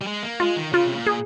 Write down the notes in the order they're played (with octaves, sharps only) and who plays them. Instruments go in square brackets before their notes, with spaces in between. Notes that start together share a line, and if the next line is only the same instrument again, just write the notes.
[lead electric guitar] G3
G#3
A#3
[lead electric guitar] G#3 [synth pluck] F4
[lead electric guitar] D#3
[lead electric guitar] C#3 [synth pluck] F4
[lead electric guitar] C3
A#2
[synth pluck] G#4